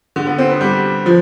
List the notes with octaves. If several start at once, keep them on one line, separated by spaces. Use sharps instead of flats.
D3
B3
C4
B3
G3
F3